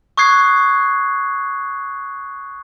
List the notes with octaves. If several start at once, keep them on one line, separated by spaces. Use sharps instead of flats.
C#6 D#6 F#6 G#6 C7